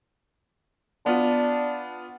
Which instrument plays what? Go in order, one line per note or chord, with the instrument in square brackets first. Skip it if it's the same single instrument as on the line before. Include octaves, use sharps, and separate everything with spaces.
[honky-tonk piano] B3 F4 [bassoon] D4